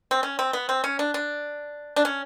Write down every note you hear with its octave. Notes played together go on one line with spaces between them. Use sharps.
C4
C#4
C4
B3
C4
C#4
D4
D4
D4
C#4